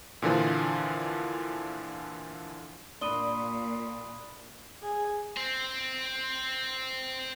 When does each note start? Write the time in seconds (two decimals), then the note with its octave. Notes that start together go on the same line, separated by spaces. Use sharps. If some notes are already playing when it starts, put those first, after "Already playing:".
0.22 A#2 D3 E3 F3
3.01 A#2 D4 B5 C6 D#6 D#7 G7
4.82 G#4
5.37 C4 C5